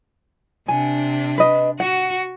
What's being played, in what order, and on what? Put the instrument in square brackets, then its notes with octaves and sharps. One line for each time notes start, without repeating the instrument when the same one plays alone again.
[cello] C3 D4 [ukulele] G#5
[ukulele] B4 D#5
[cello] F#4 [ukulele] F#5